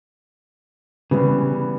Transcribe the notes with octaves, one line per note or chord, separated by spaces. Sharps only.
C#3 E3 G3 B3